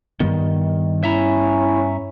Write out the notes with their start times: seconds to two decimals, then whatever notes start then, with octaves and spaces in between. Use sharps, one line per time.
0.20 G2 D#3 G3 B3
1.03 C#4 E4 E5 A#5